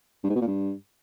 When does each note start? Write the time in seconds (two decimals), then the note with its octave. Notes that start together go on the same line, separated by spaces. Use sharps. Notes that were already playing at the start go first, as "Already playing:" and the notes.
0.24 G2
0.30 G#2
0.36 B2
0.41 A#2
0.47 G2